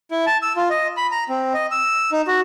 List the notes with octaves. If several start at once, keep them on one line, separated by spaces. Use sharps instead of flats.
E4
A5
E6
F4
D#5
B5
A#5
C4
D#5
E6
D#4
F#4